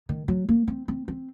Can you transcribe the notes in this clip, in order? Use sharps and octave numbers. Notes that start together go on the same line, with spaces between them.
D#3
F#3
A#3
C4
C4
C4